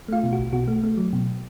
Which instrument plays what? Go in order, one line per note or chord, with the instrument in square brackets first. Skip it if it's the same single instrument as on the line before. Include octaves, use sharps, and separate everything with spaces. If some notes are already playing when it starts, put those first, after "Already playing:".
[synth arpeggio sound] A3 F4 F5
B2
F#4
B1
B2 F#4
A3
A3
F#3
B2